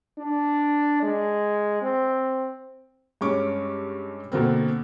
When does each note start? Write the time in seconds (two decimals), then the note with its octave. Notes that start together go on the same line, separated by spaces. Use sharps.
0.18 D4
1.02 G#3
1.82 C4
3.21 G2 G#3 C#4 C#6 D6
4.32 B2 D3 A#3 C4